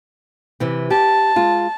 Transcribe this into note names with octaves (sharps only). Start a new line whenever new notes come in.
C3 E3 C4
G4 A5
G#3 F4